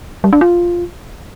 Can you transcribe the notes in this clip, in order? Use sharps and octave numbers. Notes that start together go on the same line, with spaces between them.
G3
D4
F4